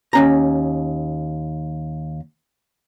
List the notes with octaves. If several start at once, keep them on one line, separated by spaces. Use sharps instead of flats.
D#2 C#4 A#5